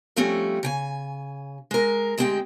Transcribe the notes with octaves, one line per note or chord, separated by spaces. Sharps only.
F3 G3 A3 C4 C#4
C#3 G5 G#5
G#3 A#4
D2 G#3 C4 F4 G4 G5